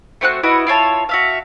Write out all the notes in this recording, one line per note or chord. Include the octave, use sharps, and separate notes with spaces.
A3 C4 F#4 F#6
E4 F#4 B4 D#5
E4 F4 C#5 A5
F#4 E5 F5